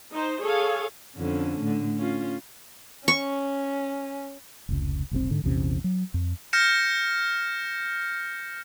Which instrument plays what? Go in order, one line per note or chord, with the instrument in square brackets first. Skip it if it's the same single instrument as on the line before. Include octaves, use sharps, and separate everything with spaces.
[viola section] D#4 C5
G#4 A4 C#5 F5
[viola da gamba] F2 D3 C#4
A2 D3
C#4 F4
[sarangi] C#4 [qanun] C#6
[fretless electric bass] F1 C#2
F1 B1 A#2 C4
G#2 D3
A#1 E2 C3 C#4
F#3
F2
[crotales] F6 G6 A#6 C#7 E7